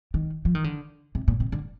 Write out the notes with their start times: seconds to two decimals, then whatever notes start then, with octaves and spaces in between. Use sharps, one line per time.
0.14 D#3
0.45 F3
0.55 D#3
0.64 D3
1.15 C3
1.28 A#2
1.40 C3
1.52 D3